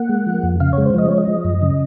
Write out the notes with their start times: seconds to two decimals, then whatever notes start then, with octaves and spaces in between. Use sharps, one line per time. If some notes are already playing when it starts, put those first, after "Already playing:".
Already playing: A#3 F#5
0.09 G#3
0.26 F3
0.43 F2
0.60 C#3 F5
0.73 G#3 C#5
0.86 C5
0.94 F3 D#5
1.09 G#3 C#5
1.18 D#5
1.28 F3
1.45 F#2
1.62 C#3